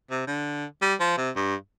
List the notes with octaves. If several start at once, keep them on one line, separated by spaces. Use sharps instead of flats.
C3
D3
G3
F3
C3
G2